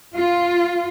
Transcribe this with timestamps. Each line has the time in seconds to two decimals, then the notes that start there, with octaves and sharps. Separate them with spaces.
0.14 F4